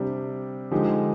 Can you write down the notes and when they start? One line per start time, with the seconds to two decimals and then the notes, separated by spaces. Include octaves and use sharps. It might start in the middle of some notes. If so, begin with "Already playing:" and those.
Already playing: C3 G3 D4
0.71 D3 F3 G#3 D#4 G4